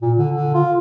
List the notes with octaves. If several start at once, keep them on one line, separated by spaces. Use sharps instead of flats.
A#2
D3
D3
F4